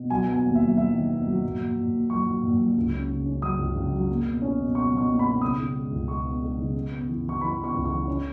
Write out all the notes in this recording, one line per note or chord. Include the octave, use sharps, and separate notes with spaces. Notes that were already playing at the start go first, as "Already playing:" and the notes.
Already playing: B2
F#3 G#5
B3
G#5
D#2
E5
F#3
F#3 E5
D#3
B3
F#3
A#2
A#2
A#2
A#3
F#3 C#6
F#3
A#2
F#3
C#2
C#4
C#3
C#4
F#3 D#6
C#2
C#2
F#3
A#3
B2
C#4
B2
B2 C#6
B2
C#6
A#3
B5
B2
C#3 D#6
C#3
G#3
C#2
G#3 C#6
B3
G#3
C#3
C#3
B3
E3
E3 C#6
E3 B5
B3
C#6
C#2
C#6
E3
C#4